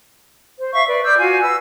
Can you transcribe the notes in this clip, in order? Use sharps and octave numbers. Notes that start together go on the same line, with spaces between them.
C5
E5 F5 C#6
B4 D5
D5 D6 E6 G6
F4 F#4 F5 G#5
B4 E6